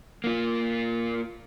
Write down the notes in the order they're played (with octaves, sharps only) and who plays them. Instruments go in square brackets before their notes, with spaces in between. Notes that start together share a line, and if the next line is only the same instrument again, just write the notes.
[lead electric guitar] A#3 F4